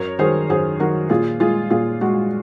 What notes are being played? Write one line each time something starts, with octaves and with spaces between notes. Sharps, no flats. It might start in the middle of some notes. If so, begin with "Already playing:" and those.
Already playing: F#2 A#4 C#5
D#3 F#3 G#4 C5
F#2 G#4 C5
D#3 F#3 F#4 A#4
A#2 F4 G#4
G#3 F4 G#4
A#2 F4 G#4
G#3 F#4